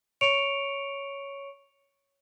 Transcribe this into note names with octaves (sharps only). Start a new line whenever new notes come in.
C#5 C#6 C#7 D7 F7